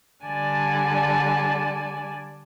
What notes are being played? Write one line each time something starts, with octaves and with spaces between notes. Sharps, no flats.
D3 G3 D5 G#5 A5